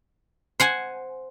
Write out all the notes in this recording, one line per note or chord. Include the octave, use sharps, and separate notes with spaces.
C5 F#5 G#5